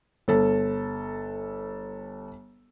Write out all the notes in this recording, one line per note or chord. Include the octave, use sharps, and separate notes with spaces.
G1 A4